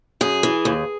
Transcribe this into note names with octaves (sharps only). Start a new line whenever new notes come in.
F#2 G#4
E3
D#2